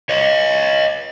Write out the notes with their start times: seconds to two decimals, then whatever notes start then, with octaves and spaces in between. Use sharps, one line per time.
0.09 C#5 D#5